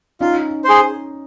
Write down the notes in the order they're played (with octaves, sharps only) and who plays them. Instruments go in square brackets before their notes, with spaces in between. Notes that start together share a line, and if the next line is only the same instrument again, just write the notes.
[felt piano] C#4 D#4 [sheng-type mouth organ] F4
[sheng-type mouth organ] G#4 C5